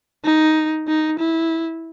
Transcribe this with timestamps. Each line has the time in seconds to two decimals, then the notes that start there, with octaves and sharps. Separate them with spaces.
0.24 D#4
0.88 D#4
1.19 E4